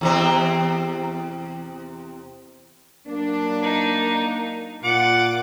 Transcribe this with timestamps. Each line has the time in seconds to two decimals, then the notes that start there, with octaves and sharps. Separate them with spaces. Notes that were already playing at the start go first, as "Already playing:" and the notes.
0.01 E2 C3 C4
3.08 F#3 A#3 D4
3.63 D#4
4.84 A#2 F4 F#5 D6